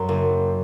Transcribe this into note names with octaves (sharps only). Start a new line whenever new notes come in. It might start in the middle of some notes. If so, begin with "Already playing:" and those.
Already playing: F#2 C6
F#1